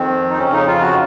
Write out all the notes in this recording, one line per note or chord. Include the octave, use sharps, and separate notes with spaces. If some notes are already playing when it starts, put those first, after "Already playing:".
Already playing: F2 D#3 C4
D#4
F2 C#3 C#4
D#4
F4
F#4